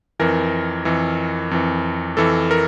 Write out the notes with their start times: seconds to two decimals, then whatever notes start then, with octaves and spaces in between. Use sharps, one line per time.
0.20 F2 E3 A#4
0.85 F2 E3
1.51 F2 E3
2.17 F2 E3 A4
2.51 A#4